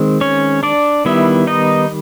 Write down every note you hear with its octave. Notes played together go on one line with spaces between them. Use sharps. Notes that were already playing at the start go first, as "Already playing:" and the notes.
Already playing: D#3 G#3 C4
C#4 C#5
D4 D5
D#3 G3 B3 E4 E5
D#4 D#5